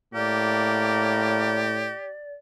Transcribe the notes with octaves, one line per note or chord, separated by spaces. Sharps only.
A2 A#3 G4 D5